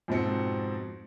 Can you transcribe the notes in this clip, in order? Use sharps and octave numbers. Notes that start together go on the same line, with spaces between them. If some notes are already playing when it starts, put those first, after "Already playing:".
F2 G#2 B2 C4 C#7